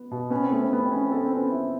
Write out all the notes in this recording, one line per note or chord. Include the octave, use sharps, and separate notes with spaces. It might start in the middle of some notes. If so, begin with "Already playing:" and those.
Already playing: B3
B2
B3 C#4
C4
A3 B3
C4
A3 B3
C4
B3 C#4
C4
B3 A4
C4
B3 C#4
E4